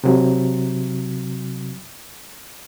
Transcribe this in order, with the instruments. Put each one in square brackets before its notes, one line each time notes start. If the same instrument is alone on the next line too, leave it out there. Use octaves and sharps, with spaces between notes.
[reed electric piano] C3 F#3